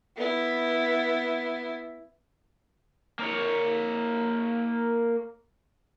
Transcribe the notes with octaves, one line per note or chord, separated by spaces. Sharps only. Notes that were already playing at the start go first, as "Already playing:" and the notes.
B3 E4
A#3 C#5